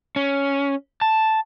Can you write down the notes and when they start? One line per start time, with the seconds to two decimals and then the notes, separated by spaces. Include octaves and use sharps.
0.16 C#4
1.01 A5